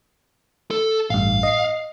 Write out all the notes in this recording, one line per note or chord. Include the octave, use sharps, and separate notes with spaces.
A4
A1 G2 F5
D#5 C7